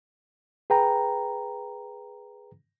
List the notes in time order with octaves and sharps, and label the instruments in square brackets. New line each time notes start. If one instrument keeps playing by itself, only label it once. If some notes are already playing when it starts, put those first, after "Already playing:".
[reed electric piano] G#4 B4 G5 A#5